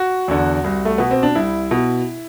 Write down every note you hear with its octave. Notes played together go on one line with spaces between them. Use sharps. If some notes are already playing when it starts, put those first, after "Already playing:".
Already playing: F#4
E2 D3
C2
A3
B2 B3
C4
D4
C2 E4
B2